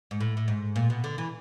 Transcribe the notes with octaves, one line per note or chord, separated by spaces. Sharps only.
G#2
A2
A2
G#2
A#2
B2
D3
E3